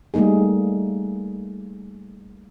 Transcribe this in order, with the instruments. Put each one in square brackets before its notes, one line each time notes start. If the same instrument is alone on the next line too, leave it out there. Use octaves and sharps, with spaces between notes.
[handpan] G3 A3 A#3 D#4 G#4